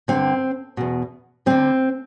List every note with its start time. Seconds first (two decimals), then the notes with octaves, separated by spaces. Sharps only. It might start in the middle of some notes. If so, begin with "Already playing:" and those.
0.08 G2 D3 C4
0.77 E2 B2
1.46 D2 D3 C4